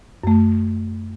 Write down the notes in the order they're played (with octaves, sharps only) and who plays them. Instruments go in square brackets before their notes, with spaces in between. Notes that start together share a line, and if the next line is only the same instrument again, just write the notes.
[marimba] F#2 A3